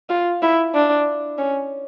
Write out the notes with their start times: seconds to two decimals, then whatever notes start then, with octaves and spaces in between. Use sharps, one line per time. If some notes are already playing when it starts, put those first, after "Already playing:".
0.09 F4
0.42 E4
0.74 D4
1.38 C#4